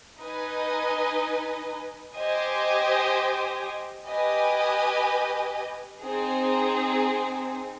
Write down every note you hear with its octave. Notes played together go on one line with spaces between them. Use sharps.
D#4 B4 D#5 G#5
G4 C5 D#5 G#5
G4 B4 D#5 G#5
C4 D#4 G#4